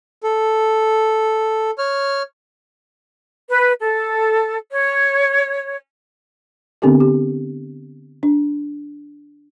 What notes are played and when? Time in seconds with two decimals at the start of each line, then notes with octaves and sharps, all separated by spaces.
0.24 A4
1.78 C#5 F6
3.49 B4
3.81 A4
4.70 C#5
6.82 D3 B3 C4 D4 G4 A4
7.00 D3 G4
8.23 D4